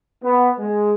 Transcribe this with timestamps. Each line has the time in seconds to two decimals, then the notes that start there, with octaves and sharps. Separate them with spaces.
0.23 B3
0.58 G#3